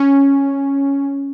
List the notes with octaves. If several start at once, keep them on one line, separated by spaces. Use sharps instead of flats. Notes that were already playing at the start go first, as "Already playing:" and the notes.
Already playing: C#4